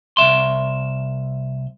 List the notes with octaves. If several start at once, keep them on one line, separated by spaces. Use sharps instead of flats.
C2 G#2 E5 C6